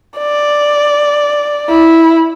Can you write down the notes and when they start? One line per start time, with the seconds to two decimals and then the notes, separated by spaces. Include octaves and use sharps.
0.19 D5
1.69 E4